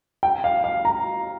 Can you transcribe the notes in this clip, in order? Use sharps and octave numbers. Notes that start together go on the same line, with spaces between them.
G5
F5
F5
A#5